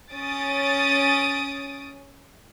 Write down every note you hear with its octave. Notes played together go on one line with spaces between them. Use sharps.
C#4 D#6 A6 D7